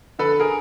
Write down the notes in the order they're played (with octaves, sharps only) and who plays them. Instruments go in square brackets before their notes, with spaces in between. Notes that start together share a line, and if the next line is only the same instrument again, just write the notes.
[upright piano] D3 A4 B4
G#4 A#4